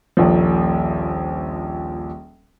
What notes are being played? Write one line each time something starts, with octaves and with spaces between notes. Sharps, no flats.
D#1 A#1 F3